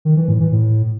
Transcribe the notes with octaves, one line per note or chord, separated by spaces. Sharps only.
D#3
E3
A2
E3
A2